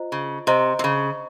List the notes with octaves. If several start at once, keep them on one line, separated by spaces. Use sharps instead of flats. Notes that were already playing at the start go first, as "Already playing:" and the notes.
Already playing: F4 C5 D#5 A#5
C#3
C3 C5 D#5 A#5
C3
C#3